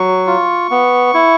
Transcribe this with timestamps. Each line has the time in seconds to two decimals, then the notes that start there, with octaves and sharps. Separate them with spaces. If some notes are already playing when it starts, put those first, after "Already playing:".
Already playing: F#3 C#6
0.27 F4
0.71 B3
1.14 E4